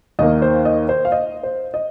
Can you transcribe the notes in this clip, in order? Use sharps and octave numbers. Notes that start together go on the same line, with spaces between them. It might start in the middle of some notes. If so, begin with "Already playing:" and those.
D#2 D#3 A#3 D#5
C5
D#5
C5
F5
D#5
C5
D#5